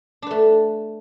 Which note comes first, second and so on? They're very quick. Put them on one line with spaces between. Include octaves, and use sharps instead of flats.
D4 B4 A3